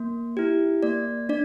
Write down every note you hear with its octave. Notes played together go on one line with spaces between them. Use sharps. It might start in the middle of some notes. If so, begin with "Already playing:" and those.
Already playing: A#3
E4 G4
A#3 D5
D4 D5